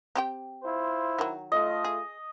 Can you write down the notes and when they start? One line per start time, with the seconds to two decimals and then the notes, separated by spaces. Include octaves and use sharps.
0.15 C4 G4 G5
0.62 E4 F4 C5
1.19 D#3 F#3
1.52 A3 F4 D#5
1.84 G#4